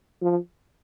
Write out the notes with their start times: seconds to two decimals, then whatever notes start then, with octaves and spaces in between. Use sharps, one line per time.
0.22 F3